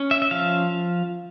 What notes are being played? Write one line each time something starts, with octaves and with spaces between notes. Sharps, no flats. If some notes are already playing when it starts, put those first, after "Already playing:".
Already playing: C#4
E5
E5
F3 F5